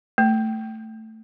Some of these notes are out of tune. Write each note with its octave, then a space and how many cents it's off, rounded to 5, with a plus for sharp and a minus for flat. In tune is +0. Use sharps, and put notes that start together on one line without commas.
A3 +5